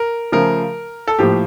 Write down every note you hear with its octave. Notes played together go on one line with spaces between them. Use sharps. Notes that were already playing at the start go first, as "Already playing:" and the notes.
Already playing: A#4
C#3 F3 A3 A#4
A4
A2 F3 A#3 G4